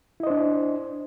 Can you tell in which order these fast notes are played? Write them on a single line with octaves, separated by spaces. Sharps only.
E4 D#5 C5 D4